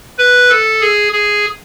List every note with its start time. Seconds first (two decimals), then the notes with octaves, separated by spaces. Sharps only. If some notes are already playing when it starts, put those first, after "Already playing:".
0.18 B4
0.49 A4
0.81 G#4
1.13 G#4